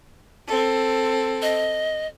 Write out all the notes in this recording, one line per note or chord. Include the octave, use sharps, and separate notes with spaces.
C4 A4
D#5